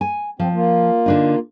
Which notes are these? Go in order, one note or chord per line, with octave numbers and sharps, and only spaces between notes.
G#5
F3 C4
A#3 F4
D3 D4 D#4